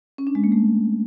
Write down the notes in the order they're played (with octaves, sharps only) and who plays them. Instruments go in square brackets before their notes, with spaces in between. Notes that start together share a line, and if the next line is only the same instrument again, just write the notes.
[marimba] C#4
D4
G#3
A#3
A3